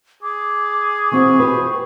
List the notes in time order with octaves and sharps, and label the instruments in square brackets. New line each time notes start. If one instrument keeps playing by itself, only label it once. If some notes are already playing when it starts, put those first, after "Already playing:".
[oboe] G#4 [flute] D6
[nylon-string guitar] E3 C4 F#4 [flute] C#6
[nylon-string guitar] G4 B4